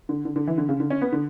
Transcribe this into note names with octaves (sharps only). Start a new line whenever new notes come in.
D3
D3
D3
E3
D3
C#3
D3
C#4
B3
D3